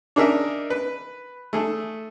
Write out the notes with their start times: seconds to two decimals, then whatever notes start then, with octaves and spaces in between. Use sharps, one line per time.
0.16 D4 D#4 G#4 A#4 E5
0.70 B4
1.53 A3 G#4 E6